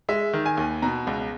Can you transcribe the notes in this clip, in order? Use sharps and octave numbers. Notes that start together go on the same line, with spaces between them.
G#3 E5
D#3
G#5
D#2
B2 A#5
C#2